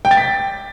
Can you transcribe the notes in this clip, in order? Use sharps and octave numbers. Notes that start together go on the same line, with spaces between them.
G5
A6
B6